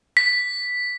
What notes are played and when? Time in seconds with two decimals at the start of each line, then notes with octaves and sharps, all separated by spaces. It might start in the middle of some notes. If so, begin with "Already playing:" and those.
0.17 B6